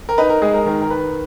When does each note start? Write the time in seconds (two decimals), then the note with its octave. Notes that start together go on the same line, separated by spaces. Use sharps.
0.09 A#4
0.18 D#4 B4
0.30 A#4
0.42 G#3 G#4
0.54 A#4
0.66 D#3 A#4
0.82 A#4
0.90 D#3 B4